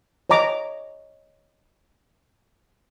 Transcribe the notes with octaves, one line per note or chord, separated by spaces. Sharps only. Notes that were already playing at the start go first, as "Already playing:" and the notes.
C#5 D#5 A#5 D6